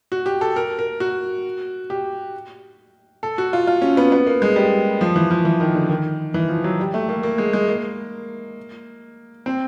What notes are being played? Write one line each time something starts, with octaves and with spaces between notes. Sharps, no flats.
F#4
G4
A4
A#4
A#4
F#4
G4
A4
F#4
F4
F4
C#4
B3
B3
A#3
G#3
G3
F3
E3
F3
E3
D#3
D3
D#3
E3
F3
F#3
G3
A3
A#3
A#3
G#3
G#3
A#3
C4